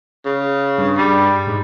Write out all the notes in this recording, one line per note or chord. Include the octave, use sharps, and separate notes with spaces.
C#3
G2
G3
G#2